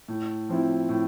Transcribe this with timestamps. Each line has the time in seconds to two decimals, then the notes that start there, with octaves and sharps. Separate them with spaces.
0.08 A2
0.49 F3 C4 E4
0.89 A2